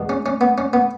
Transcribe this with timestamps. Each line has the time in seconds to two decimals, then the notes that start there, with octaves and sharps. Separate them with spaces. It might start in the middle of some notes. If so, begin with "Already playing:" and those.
Already playing: E2 B2 G#3
0.09 C#4
0.26 C#4
0.41 B3
0.58 C#4
0.73 B3